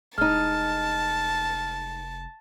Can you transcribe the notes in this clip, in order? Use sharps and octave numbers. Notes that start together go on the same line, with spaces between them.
F1 G#3 D#4 A5 F6